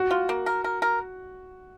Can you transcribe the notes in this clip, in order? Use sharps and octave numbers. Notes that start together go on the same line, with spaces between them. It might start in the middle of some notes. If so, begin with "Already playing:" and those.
Already playing: F#4
F4
A#3
A#4
A#4
A#4